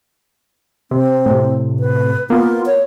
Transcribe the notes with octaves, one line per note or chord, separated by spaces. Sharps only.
C3 C4
A2 C3
B4
A#3 B3 F4
C#5